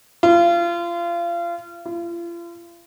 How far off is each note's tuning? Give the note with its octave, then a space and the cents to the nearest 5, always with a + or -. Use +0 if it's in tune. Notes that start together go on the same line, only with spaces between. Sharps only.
F4 -30
F4 -40